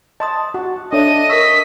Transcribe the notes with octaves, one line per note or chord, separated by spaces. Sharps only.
D#5 A5 C6 D#6
F#4
D4 A4 C#5 D#5 E5 D#7
A#4 G5 C#6 E6 B6